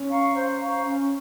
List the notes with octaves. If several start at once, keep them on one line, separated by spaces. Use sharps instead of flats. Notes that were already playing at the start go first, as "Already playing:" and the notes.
Already playing: C#4
F5 A#5 C#6
C5
F5 A#5 C#6
C#4